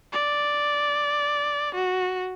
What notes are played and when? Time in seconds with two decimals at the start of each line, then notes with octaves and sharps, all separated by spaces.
0.13 D5
1.75 F#4